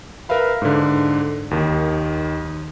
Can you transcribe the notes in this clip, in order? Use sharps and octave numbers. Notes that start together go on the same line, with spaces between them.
A#4 B4 E5 F5 B5
G#2 D3
D#2 D#3